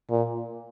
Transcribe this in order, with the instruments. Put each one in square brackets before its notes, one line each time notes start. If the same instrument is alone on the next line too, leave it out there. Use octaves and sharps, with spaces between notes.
[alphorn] A#2